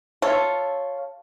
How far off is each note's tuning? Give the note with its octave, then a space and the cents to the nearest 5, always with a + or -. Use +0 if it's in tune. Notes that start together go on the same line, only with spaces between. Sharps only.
F4 +0 A4 +0 C#5 +0